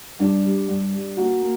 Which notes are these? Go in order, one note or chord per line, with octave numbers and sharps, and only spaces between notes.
G2 D4
G3
G2
G3
A#3 F#4
A#3